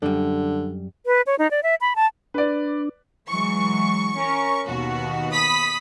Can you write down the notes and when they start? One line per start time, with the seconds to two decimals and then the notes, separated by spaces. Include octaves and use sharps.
0.02 F#2 D3 G3
1.06 B4
1.27 C#5
1.39 D#4
1.51 D5
1.63 E5
1.81 B5
1.96 A5
2.34 D4 B4 D5
3.29 E3 F#3 G#3 C#6
4.18 C#4 A#4
4.67 D#2 B2 B3 F#4
5.32 B5 D#6 B6